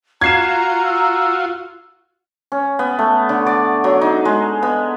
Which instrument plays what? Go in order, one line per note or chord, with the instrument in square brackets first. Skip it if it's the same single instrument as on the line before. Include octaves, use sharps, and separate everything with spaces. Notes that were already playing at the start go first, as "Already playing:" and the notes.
[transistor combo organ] F4 F#4 [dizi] A#5 [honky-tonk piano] G#6 C7 E7
[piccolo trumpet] E6
[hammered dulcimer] C#4
B3
A3
D3
D5
F#3
D#4
G#3
B3